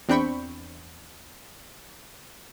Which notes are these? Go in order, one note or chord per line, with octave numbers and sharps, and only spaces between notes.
E2 C4 D4 G5 B5 C#6